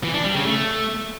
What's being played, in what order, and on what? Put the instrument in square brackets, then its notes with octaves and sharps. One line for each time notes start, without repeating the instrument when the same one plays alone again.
[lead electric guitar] E3
D4
G3
C#3
A3